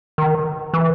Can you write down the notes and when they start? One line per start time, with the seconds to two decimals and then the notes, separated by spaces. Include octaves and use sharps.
0.18 D#3
0.74 E3